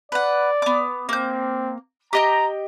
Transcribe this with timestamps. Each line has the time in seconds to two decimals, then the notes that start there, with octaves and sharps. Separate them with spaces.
0.12 B4 D5 F#5
0.62 B3 D6
1.09 A#3 C4 G6
2.13 G4 D#5 G5 A#5